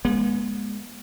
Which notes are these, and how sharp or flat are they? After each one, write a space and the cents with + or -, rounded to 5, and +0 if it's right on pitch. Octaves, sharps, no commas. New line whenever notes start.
G#3 +0 B3 -45